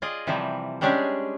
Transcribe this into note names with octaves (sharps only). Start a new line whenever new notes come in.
F4 G#4 D5 D#5
C3 E3 F3 G3
G3 G#3 C#4 D4 G4 G#4